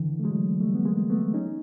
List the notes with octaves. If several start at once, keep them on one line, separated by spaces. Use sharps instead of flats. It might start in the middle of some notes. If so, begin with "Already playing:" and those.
Already playing: D3 E3
A3
F#3 G#3
G3 A3
B3
G#3 A#3
A3 B3
C#4 D#4